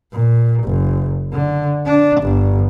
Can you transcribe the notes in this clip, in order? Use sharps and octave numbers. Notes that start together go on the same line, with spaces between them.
A#2
F#1
D3
D4
G1